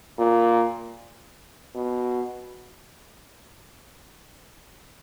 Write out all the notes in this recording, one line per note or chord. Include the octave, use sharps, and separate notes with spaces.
A#2
B2